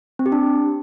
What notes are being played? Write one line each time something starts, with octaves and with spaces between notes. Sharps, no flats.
C4
G4
D4